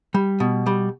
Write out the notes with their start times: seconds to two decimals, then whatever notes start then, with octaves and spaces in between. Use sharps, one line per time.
0.14 G3
0.40 B2
0.66 G3